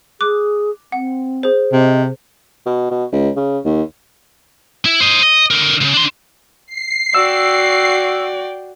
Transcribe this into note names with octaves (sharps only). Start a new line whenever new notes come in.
G#4 D6 F#6
C4 F#5
G#4 C5
C3 D#5
B2
B2
C#2
C#3
D#2
E4
C5 D#5
D#5
D3 A#4
C#2 C#3
D4 C6
C7
F#4 D5 G5 E6